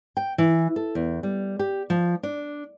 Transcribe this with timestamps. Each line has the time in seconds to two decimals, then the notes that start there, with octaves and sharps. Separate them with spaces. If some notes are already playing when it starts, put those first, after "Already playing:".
0.17 G5
0.38 E3
0.76 A4
0.95 E2
1.23 G3
1.59 G4
1.90 F3
2.23 D4